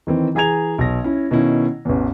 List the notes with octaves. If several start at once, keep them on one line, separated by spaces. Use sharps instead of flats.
D#3 E3 C4
E3 G#4 G#5 A#5 G#6 F7
B1 A#6
C#4 E4
B2 D#3 C#4 E4
A1 E2